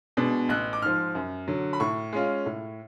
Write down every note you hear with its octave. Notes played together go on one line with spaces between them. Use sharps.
B2 G#3 D4
A1 F#6
D6
G#2 F3 F6
F#2
D3 F#3
B5
A2 C#6
G#3 C#4 F4
A2